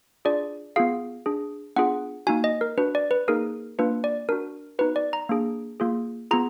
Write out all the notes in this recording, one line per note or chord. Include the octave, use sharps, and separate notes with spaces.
D4 F4 G#4 D5
B3 F4 G#4 F5
D4 G#4
B3 D4 F4 G#4 F#5
A#3 D#4 F#4 G#5
D#5
A#4
D4 F#4 B4
D5
B4
A#3 D#4 G#4 A#4
A#3 D4 F4 B4
D5
D4 F#4 A#4
B3 D#4 F#4 B4
D5
A#5
A#3 D4 G#4
A#3 F4 G#4
B3 F4 G#4 A#5